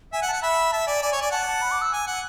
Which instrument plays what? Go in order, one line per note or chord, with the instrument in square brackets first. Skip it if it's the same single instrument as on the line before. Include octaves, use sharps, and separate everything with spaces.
[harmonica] E5 [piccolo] G#5
[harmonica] F#5
[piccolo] A5
[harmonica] F#5
[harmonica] E5 [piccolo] B5
[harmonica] E5 [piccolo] A5
[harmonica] D5 [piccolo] G#5
[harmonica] D5 [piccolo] G#5
[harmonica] C#5
[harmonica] D5 [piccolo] G#5
[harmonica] F#5 [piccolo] A5
[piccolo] A5
B5
D6
E6
[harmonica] G#5
F#5